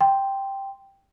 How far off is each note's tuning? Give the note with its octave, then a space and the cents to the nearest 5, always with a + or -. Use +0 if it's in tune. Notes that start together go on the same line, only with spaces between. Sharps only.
G5 +0 C6 +0